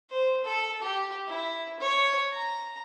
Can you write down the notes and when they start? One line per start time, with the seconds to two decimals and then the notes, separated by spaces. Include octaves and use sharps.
0.10 C5
0.44 A4
0.82 G4
1.27 E4
1.79 C#5
2.32 A#5